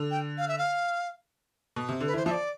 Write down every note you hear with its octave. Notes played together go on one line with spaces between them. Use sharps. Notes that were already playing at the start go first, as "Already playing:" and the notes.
Already playing: D3
G5
F5
E5
F5
B2
C3
D3
B4
E3 C5
F3 E5
D5